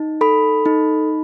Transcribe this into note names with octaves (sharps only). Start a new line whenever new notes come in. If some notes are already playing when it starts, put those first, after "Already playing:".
Already playing: D#4
A4 B5
D#4